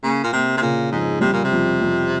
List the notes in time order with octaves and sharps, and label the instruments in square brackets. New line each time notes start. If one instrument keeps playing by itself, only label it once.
[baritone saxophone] C#3 [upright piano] A#3
[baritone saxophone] A#2
[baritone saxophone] C3 [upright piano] A#3
[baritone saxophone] C3
[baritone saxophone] A#2 [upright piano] C#3
[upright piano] F2 [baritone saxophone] G#2
[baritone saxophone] C3 [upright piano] G3
[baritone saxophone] A#2
C3
[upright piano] F2
F2